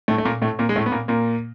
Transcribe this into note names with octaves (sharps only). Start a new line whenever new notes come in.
A2 A3
A3
A#2 A#3
A2 A3
A#2 A#3
G#3
A2 A3
B3
A#2 A#3
A#2 A#3